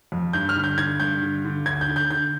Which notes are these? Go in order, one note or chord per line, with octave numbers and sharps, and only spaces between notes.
F2
G2 G6
F6
D3
G6
D3 G#6
G2 G6
D3
D3
D2 G#6
G6
D3
G6
D3 G6